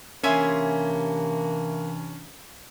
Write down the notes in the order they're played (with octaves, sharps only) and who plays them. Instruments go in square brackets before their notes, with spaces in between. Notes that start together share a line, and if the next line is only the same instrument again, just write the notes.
[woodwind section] C3 E3 D4 [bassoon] A#3 [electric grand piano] C#4 [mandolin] E5 G#5 C6